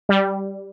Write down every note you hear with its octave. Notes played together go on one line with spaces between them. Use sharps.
G3